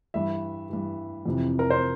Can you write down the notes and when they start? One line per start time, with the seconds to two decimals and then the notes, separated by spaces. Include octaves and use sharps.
0.14 G2 E3 E5
0.70 G2 E3
1.26 F2 C3 E3
1.59 A#4
1.70 C5